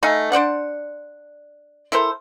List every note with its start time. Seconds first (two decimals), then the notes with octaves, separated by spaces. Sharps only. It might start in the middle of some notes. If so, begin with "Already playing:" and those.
0.03 A3 D#4 F5 G#5
0.32 D4 C5 D5 F#5
1.92 E4 A4 A#4 C5